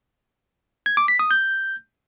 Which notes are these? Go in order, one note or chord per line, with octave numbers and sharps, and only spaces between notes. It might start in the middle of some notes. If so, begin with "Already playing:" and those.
G#6
D6
B6
D#6
G6